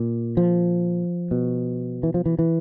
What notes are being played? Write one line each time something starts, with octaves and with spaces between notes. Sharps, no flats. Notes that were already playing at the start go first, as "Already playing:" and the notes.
Already playing: A#2
F3
B2
E3
F3
E3
E3